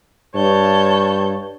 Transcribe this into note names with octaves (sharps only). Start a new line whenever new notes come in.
G2 C#5 A5 G6